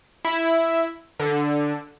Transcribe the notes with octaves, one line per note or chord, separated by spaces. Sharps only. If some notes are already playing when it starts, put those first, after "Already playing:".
E4
D3